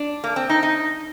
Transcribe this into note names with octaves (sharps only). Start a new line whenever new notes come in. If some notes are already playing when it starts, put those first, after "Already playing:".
Already playing: D4
A#3
C4
D#4
D#4